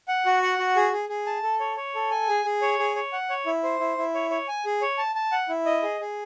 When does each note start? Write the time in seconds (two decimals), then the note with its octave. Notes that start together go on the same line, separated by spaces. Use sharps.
0.08 F#5
0.26 F#4
0.42 F#5
0.58 F#4
0.76 G#4
0.93 G#4
1.09 G#4
1.27 A5
1.43 A4
1.60 C#5
1.77 C#5
1.95 A4
2.11 G#5
2.29 G#4
2.45 G#4
2.62 C#5
2.79 G#4
2.96 C#5
3.13 F#5
3.30 C#5
3.46 E4
3.63 C5
3.80 E4
3.97 E4
4.15 C#5
4.30 C#5
4.48 G#5
4.65 G#4
4.82 C#5
4.98 A5
5.15 A5
5.32 F#5
5.49 E4
5.66 D#5
5.83 G#4
6.00 G#4